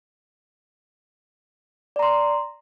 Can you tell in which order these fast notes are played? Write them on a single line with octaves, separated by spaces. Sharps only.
D5 A#5 C6